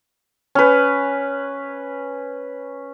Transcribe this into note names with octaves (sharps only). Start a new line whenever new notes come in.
C#4 B4